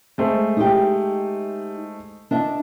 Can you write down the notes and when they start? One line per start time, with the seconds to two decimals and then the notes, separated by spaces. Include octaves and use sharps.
0.18 G#3 A3 C5
0.57 D#4 G4
2.31 D4 D#5 E5